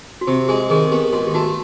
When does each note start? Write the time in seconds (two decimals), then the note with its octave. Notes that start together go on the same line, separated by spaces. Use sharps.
0.21 F#4
0.27 C3 G4
0.49 G#3 G#4
0.70 D#3 G#4
0.92 B3 G4
1.13 G#2 F#4
1.27 G4
1.34 A3 F#4